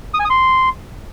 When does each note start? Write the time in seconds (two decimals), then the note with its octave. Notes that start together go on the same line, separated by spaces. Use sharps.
0.14 D#6
0.19 G#5
0.25 D#6
0.30 C6